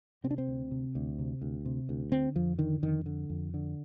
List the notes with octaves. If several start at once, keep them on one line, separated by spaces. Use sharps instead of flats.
C3 C4
D4
C4
D2
C3
D2
C3
D2
C3
D2
D3 C4
F2 F3
D3 D#3
F2 D#3
D3
F2
D3